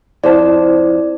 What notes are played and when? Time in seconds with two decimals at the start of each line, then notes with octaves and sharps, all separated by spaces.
0.24 F2 E4 C5 D5 A5